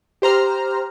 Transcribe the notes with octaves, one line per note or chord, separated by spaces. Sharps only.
G4 C5 A#5 F6